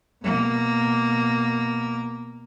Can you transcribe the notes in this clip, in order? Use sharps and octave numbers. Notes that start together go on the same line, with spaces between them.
B2 A#3